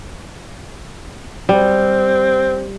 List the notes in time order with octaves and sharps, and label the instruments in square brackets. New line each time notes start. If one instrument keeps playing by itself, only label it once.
[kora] G3 [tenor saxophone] C4